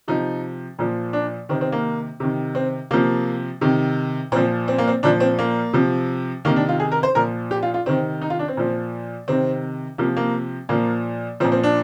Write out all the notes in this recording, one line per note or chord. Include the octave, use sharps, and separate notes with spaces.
C3 F3 D#4
A#2 F3
D4
C3 D#3 C4
C4
A#3
C3 D#3
C4
C3 F3 A#3
C3 D#3
A#2 F3 C4
C4
A#3
C4
A#2 F3 D4
C4
A#3
C3 F3
C3 D#3 A#3
D4
F4
G#4
A#4
C5
A#2 F3 A#4
G4
F4
F4
C3 D#3 C4
D#4
F4
D4
C4
A#2 F3
C3 D#3 C4
C3 F3 A#3
A#3
A#2 F3 A#3
A#2 F3 C4
C4
D4